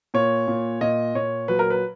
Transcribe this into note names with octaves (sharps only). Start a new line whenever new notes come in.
A#2 C#5
A#2
A#2 D#5
A#2 C#5
F#3 B4
A#4
B4